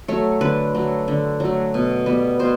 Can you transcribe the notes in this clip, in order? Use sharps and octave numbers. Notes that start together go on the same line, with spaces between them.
F#3 A3 C#5
D3 B4
F#3 A3
D3
F#3 A3
B2
G3 B3
B2 C5